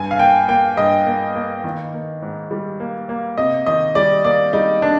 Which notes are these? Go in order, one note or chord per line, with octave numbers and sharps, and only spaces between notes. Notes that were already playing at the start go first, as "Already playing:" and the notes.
Already playing: G2 G#5
F5
A#3 G5
A#3 G5
G2 D#5
A#3
A#3
D#3
A#3
G#2
G3
A#3
A#3
C3 D#5
D#3 D#5
G3 D5
A#3 D5
G3 D#4
A#3 D4